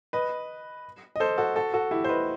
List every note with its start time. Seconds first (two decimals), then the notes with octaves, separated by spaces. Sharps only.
0.13 B4 D#5
1.16 D#5
1.20 A4 C5
1.38 F#4 A4
1.56 F#4 A4
1.74 F#4 A4
1.91 E4 G4
2.04 C5
2.09 B4 D#5